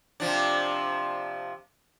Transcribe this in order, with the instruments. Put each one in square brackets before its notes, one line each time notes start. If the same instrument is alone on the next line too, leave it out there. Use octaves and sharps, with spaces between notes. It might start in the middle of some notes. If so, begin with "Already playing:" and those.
[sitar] C3 F3 D4